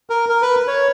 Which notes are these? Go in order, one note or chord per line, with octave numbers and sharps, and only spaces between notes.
A#4
A#4
B4
C#5